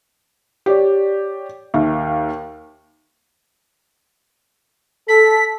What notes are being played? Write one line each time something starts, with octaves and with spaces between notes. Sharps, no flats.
G4 C#5 D5
D#2 E5 F5
A4 B6